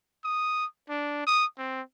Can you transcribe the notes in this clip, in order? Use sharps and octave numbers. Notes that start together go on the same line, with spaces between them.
D#6
D4
D#6
C4